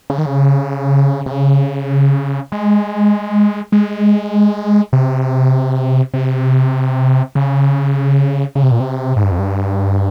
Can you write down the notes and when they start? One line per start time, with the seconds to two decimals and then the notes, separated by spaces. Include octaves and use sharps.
0.10 C#3
0.18 D#3
0.26 C#3
1.26 C3
1.31 C#3
2.52 G#3
3.72 G#3
4.93 C3
6.14 C3
7.35 C#3
8.55 C#3
8.63 C3
8.71 A#2
8.80 C3
9.16 G#2
9.23 G2
9.31 F2
9.39 G2